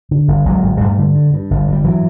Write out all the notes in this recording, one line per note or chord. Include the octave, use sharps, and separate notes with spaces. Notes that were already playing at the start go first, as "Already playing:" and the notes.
D3
G1
G1 F#3 G#3
G1
G2 G3 A3
D3
G2
G2
G1
G2 G3
E3 F#3